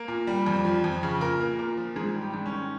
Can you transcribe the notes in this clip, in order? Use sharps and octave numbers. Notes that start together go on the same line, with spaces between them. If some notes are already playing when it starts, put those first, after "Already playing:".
Already playing: A#3
A#2
G3
F2
F3
F2
C#3
A#2 A#4
A#3
A#2
F3
G#2 G#4
G3
G4
G#2
C#4
D#3